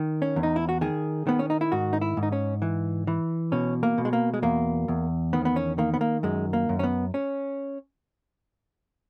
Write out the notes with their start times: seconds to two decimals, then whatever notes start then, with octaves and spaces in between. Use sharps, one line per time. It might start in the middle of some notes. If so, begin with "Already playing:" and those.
Already playing: D#3
0.22 C#4
0.36 E2
0.43 D#4
0.56 E4
0.69 F#4
0.81 D#3 G#4
1.27 D#3 B3
1.39 C#4
1.50 D#4
1.61 E4
1.72 G#2 F#4
1.93 D#4
2.01 E4
2.17 G#2
2.23 D#4
2.32 C#4
2.62 E3
3.07 E3
3.52 B2 C#4
3.83 A#3
3.98 B2
4.05 G#3
4.13 A#3
4.34 G#3
4.42 E2 A#3
4.88 E2
5.33 D#3 B3
5.45 B3
5.56 C#4
5.78 D#3 A#3
5.94 B3
6.01 A#3
6.23 F#2 G#3
6.53 A#3
6.69 F#2
6.79 C#4
6.83 B3
7.14 C#4